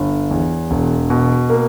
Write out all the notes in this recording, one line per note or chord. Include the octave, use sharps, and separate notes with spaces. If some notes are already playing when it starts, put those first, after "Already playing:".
Already playing: G1
E2
E1
B2
A#3